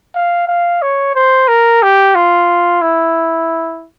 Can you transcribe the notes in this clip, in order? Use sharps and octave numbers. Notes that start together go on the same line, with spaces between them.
F5
F5
C#5
C5
A#4
G4
F4
E4